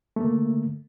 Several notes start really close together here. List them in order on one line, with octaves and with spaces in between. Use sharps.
A3 A#3 D3